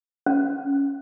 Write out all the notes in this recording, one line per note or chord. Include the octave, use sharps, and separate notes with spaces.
C#4